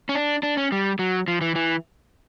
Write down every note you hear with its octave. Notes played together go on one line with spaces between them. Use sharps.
C#4
D4
D4
C#4
G3
F#3
F3
E3
E3